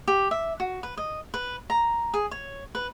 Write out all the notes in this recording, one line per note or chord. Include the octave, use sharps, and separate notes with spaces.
G4
E5
F#4
B4
D#5
B4
A#5
G#4
C#5
B4